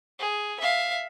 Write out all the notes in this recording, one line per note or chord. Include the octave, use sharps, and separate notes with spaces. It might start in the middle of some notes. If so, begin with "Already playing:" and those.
G#4
E5 F5